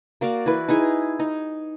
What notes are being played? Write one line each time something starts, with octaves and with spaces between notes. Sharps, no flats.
A#3 F#4 D5 F5
E3 B4
D#4 E4 G#4 G#5
D#4